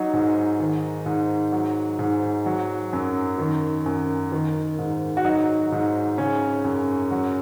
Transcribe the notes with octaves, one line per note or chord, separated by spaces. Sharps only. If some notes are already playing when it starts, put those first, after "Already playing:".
Already playing: F#3 D#4
G#2
D#3
G#2
F#3
G#2
F#3
F#2
D#3
F#2
D#3
G#2
F#4
F#3 D#4
G#2
C#3 C#4
F#2
F#3